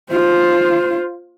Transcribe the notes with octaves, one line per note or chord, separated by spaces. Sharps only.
F4 C5